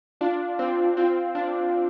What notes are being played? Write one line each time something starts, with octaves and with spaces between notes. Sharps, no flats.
D4 F4
C4
C4 F4
D4 F4